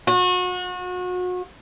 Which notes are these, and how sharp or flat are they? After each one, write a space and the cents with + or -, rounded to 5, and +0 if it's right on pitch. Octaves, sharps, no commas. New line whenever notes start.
F#4 -35